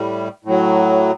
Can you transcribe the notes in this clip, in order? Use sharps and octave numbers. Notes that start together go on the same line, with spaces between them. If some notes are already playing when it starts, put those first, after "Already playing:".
Already playing: A2 G3
A2 F#3